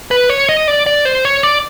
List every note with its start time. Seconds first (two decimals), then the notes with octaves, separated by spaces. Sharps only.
0.11 B4
0.30 C#5
0.49 D#5
0.68 D5
0.86 D5
1.05 C5
1.25 C#5
1.43 D5